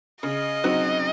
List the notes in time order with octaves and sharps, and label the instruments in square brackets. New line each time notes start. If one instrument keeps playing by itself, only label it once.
[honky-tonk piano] C#3 [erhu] D#5
[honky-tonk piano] F#3 C4 D#4 F#4